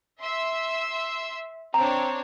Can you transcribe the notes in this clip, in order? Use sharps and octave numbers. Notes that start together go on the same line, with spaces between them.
E5 C6 E6
C4 D4 C#5 A#5